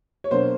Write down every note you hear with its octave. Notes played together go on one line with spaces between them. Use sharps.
C#5
B2 F#3 A#3 D4 C5